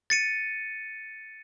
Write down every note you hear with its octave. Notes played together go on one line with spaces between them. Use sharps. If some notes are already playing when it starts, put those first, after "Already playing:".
A6 C#7 D#7